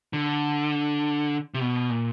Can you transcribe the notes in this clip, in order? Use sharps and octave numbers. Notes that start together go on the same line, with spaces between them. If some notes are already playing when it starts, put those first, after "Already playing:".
D3
C3
B2
A#2